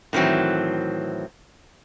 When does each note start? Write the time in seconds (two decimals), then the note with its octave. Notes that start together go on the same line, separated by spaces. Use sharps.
0.13 A2 D#3 E3 F#3 C4